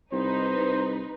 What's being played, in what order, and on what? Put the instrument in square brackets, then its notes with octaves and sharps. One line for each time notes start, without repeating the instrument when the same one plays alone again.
[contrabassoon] C2 [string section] D#4 B4 [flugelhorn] C5
[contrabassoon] C2